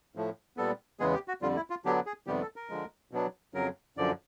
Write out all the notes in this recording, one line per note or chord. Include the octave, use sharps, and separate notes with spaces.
A2 F3 A3
A#2 G3 B3 A4
E2 C#3 E3 G#3 B3 G#4
G4
F#4
F2 D3 G3 F4
E4
F4
D3 F#3 B3 D4 G4
G#4
F2 C3 D#3 G3 B3 G4
A4
A#4
D3 F3 G#3
B2 F#3 B3 D4
F2 C#3 F#3 A#4
F#2 D3 F3 D5